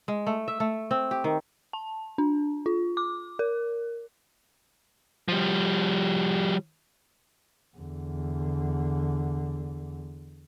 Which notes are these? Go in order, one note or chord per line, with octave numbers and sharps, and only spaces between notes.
G#3
A3
E5
A3
C4
G4
D#3
A5
D4
F4
D6
A#4
F3 G3
E2 D3